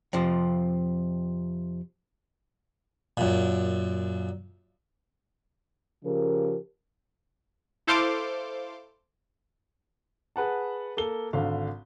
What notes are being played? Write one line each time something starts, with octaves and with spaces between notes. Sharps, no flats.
F2 C3 F3
F#2 A#2
C#3 F3 G4 A#4
E4 A4 C5 F5 C6 D6
G#4 B4 F#5 A5
A#3 A4 G7
G#1 D3 F5